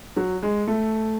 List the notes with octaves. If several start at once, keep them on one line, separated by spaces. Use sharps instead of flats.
F#3
G#3
A3